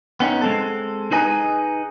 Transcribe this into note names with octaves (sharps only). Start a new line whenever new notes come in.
B3 C#4 D#4
G#3 C4 A4
D#4 G#4 B4 D#5 G#5 A#5